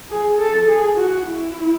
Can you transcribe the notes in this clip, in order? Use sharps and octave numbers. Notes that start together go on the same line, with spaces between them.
G#4
A4
G#4
F#4
E4